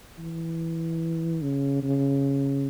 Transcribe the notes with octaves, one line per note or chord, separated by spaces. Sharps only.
E3
C#3
C#3